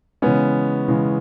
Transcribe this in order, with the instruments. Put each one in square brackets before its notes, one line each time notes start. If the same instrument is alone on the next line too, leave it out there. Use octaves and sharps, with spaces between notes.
[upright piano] C#3 E3 G#3 [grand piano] B3 C#4
[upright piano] C#3 E3 G#3